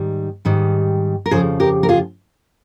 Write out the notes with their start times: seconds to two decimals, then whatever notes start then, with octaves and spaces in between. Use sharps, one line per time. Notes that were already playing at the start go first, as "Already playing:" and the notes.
Already playing: G#2 D#3 G3
0.45 G#2 D#3 G3
1.26 A#4
1.31 F2 C#3 F3 G#4 C5
1.60 G4 A#4
1.83 A#4
1.89 F4 G#4